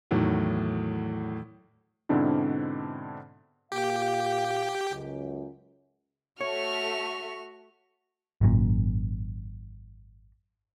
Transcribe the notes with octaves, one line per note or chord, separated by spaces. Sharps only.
E2 A2 D#3 F#3
G#2 B2 D3 C4 D4 E4
A#2 G4 F5 G5
C#2 F#2
A3 F#4 C#5 E5 C#6 F6
G#1 F#2 A#2